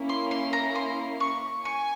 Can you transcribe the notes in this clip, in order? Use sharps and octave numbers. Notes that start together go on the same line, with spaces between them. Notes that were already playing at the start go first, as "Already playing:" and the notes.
Already playing: A#3 C#4 E4
C6
C6
A#5
C6
C#6
G#5 C#6